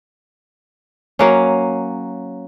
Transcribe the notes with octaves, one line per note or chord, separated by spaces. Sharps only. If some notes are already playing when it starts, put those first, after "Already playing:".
F#3 A#3 C#4